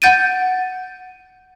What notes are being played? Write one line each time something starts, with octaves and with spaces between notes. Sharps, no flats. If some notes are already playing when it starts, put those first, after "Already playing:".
F#5 G6 A6 D7 D#7